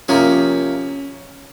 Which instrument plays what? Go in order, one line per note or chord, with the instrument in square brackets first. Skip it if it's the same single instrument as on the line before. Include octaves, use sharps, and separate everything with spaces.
[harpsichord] C3 F3 A#3 F4 G#4 [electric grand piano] C#4